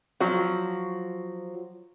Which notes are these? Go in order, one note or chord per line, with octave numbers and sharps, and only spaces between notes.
F3 F#3